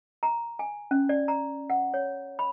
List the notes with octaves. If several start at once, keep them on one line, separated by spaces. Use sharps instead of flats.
A#5
G#5
C#4
D5
A#5
F#5
C#5
B5